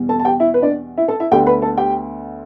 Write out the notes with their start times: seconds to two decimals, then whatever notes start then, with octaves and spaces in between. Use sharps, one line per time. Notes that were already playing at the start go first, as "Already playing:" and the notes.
Already playing: E2 B2 G3
0.09 A4 A5
0.19 A5
0.25 G4 G5
0.40 E4 E5
0.54 B4
0.62 D4 D5
0.98 E4 E5
1.08 A4 A5
1.20 E4 E5
1.31 D2 D3 B3 G4 G5
1.47 B4 B5
1.62 A4 A5
1.77 G4 G5